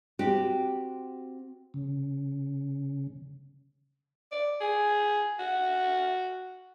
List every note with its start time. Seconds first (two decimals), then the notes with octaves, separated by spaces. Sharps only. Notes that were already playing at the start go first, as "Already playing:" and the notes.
0.19 C4 F#4 G4
1.74 C#3
4.32 D5
4.61 G#4
5.39 F#4